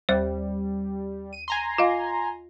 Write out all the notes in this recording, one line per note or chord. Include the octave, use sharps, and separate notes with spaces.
D#2 G3 C5
D#7
G#5 A#5 C6
F4 D#5 F5